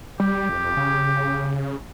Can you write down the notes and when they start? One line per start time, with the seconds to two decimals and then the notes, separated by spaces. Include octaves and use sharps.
0.20 G3 G4
0.49 F2
0.77 C#3